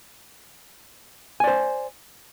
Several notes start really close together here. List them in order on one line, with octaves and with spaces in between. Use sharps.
G#5 D5 C5